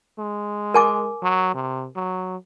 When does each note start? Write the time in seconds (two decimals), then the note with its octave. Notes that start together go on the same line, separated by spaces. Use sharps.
0.19 G#3
0.74 A#4 G#5 D6
1.23 F#3
1.54 C3
1.96 F#3